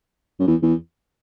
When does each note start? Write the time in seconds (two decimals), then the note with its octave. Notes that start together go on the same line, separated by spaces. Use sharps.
0.39 F#2
0.47 E2
0.63 E2